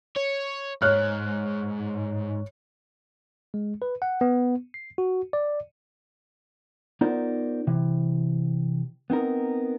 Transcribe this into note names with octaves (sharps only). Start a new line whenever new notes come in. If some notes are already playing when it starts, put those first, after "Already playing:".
C#5
G#2 C#5 F6 F#6
G#3
B4
F#5
B3
C7
F#4
D5
B3 D#4 F4 A#4 C5 D5
C3 E3
B3 C4 D#4 A#4